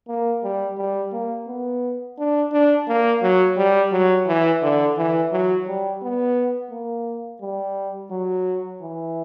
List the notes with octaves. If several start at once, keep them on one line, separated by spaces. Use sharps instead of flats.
A#3
G3
G3
A#3
B3
D4
D4
A#3
F#3
G3
F#3
E3
D3
E3
F#3
G3
B3
A#3
G3
F#3
E3